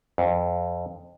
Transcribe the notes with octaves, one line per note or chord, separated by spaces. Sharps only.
F2